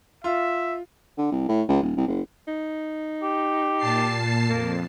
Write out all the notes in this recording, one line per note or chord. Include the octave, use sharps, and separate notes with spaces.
F4 E5
D3
C2
A2
C#2
D#1
C2
F#1
D#4
G4
A#2 A5 C7
F2 A#3